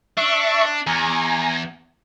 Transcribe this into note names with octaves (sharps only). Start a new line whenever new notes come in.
D4 E5 C#6
E2 G#5 A#5